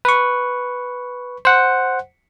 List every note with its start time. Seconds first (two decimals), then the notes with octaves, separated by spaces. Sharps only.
0.05 B4 C#6
1.45 C5 F#5